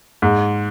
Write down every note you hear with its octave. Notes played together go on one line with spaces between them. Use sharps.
G#2